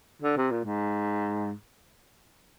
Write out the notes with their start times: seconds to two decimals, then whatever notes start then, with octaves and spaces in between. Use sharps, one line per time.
0.22 D3
0.37 C3
0.51 A#2
0.65 G#2